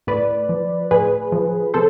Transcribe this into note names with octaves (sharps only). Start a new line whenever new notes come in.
A2 B4 D5
F3
A2 G#4 B4
F3
C3 A4 C5